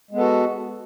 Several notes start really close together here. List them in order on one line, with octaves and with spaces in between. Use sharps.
G#3 B3 A4 F#4